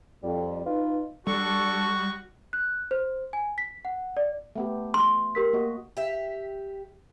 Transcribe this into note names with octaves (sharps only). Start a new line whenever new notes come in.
F2 G3
D#4 F4 B4
G3 D4 F#4 A4 C#6
F#6
C5
G#5
B6
F#5
D5
A3 B3 G4
C6
G4 A#4 B6
A#3 F#4 D#5
G4 E5